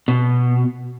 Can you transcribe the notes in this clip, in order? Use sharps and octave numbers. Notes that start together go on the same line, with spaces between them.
B2